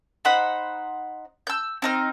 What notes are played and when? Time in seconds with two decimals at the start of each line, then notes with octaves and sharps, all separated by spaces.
0.25 D#4 C5 F#5 B5
1.47 E6 G6
1.82 C4 D#4 F6